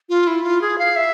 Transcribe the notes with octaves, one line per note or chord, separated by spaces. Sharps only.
F4
E4
F4
G#4
F5
E5